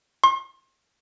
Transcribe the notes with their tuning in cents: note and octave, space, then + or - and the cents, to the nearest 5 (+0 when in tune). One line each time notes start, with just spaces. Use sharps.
C6 +40